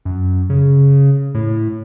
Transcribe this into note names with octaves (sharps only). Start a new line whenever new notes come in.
F#2
C#3
A2